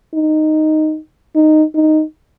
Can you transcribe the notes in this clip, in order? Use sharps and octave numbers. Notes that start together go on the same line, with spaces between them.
D#4
D#4
D#4